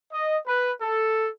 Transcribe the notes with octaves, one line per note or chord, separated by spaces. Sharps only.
D#5
B4
A4